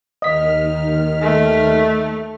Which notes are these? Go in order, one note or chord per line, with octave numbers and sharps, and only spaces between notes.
D#2 D#3 D#5 F6 B6
A3